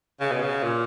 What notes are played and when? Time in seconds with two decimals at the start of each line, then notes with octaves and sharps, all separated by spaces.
0.21 C#3
0.32 B2
0.43 C#3
0.63 A#2